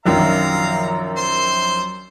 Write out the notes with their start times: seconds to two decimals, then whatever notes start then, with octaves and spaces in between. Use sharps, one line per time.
0.06 A#1 F#2 D#3 F5 A#5
1.16 C5 C6